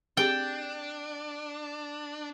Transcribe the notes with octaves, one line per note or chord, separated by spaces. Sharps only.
C4 D4 G4 G#4 G5